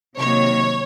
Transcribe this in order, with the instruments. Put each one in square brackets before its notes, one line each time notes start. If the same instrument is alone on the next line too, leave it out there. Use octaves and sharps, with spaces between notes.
[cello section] C3 D#3 F#3 A#3 [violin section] C#5